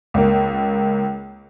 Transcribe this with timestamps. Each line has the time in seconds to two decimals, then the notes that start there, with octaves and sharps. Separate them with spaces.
0.14 C#2 A#3